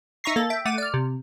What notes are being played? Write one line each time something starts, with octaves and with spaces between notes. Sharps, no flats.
D#4 E5 A#5 C#6 A#6 C7
A#3 A4 A6
E5 G5
A3 F#5 D6 D#7
D5 F6
C3